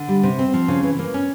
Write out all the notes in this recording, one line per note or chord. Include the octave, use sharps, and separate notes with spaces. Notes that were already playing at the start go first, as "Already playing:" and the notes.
Already playing: D3
G3
C3
C4
F3
C#3
E3
A#3
C#4